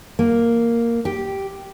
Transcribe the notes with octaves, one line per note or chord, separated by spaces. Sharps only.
A#3
G4